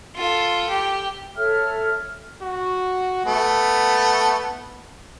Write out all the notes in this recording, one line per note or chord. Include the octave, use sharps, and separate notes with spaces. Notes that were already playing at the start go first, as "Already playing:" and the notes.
F4 A4
G4
A4 C#5 E5 F6
F#4
A3 B3